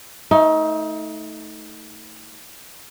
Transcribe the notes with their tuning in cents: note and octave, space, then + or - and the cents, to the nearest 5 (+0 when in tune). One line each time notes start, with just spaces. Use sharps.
A3 +0 D#4 +25